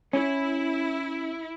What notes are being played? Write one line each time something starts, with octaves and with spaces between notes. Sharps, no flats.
C#4 E4